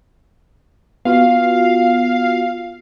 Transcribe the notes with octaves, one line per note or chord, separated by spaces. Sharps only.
B3 F4 F#4 F5